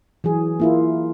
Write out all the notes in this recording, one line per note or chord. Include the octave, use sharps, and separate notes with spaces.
E3 F#3 G#4
A#3 E4 F4